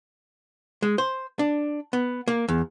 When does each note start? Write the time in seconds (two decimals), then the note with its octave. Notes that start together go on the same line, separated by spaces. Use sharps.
0.82 G#3
0.98 C5
1.39 D4
1.93 B3
2.28 A#3
2.49 E2